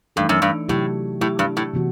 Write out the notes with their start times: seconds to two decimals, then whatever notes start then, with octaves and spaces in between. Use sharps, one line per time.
0.16 G2 E3 A3 D#4 A4
0.29 F#2
0.42 G2
0.69 A2 C3 F#3 A3 E4 G4
1.21 A2 F#3 A3 E4 G4
1.39 G2
1.57 A2
1.74 C3 E3 B3 F#4